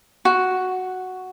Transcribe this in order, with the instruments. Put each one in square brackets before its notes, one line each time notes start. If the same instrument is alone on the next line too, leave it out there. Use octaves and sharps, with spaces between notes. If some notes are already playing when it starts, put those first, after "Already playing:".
[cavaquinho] F#4